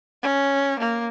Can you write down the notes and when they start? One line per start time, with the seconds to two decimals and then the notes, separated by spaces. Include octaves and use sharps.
0.23 C#4
0.79 A#3